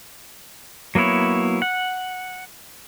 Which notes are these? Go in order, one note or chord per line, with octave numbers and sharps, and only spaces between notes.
F#3 A#3 B3 E4 C#5
F#5